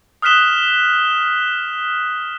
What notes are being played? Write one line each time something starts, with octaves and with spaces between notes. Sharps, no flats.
D#6 F6 F#6 B6 E7 G7